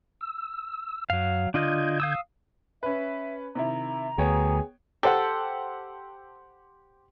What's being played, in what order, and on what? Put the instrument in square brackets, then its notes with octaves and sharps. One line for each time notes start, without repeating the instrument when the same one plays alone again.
[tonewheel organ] E6
[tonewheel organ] F#2 [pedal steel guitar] F#3 F5
[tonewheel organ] D3 G6 G#6 [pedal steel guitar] D4 F4 D#5
[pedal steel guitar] F5 D#6 E6
[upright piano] C#4 B4 [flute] E5
[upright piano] C3 D#3 E4 [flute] A#5
[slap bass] D2 [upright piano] B3 C#5 G5 [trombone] G#4
[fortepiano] G4 C5 F#5 [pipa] A4